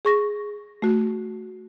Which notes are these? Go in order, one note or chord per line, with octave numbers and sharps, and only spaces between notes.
G#4 C#6 A#6
A3 F#4